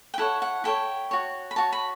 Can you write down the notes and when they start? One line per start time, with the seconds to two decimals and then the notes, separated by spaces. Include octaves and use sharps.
0.14 G5
0.18 E4 A4 C#5 F#5
0.42 F#5
0.64 E4 A4 C#5 G5
1.11 F#4 C#5
1.51 B5
1.56 F#4 C#5 A5
1.72 B5